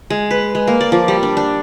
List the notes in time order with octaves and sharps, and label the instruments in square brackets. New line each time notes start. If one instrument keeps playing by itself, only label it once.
[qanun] G#3
B4
G#3
A#3
D5
F3
G3
D4
D4